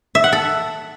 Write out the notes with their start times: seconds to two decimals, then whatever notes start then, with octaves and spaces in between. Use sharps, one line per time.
0.15 E5
0.24 F#5
0.33 A4